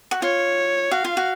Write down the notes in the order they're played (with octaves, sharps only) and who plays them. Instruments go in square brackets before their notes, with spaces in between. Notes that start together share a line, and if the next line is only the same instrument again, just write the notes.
[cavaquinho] F#4
[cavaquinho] F4 [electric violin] C#5
[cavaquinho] F#4 [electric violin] F5
[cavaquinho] F4
F#4